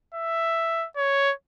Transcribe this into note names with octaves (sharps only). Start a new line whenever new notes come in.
E5
C#5